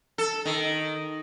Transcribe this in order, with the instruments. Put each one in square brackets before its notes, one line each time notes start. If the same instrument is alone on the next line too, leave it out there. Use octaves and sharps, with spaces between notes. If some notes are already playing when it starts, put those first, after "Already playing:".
[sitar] A4
D#3